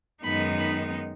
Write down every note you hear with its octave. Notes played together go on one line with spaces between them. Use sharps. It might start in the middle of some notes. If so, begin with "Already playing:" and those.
F#2 D#3 G#3 B3 D#4 B5
B5